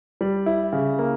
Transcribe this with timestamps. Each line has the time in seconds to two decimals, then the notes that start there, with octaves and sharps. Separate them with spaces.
0.21 G3
0.46 E4
0.73 C#3
0.99 A#3